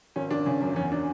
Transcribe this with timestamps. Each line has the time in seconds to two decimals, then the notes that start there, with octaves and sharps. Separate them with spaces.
0.16 G#1 C#4
0.31 G#1 D4
0.46 C#3 C#4
0.61 F#2
0.76 E2 C#4
0.92 D4